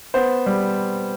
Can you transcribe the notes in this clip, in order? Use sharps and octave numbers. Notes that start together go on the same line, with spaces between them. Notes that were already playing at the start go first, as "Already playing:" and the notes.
B3 C5
G3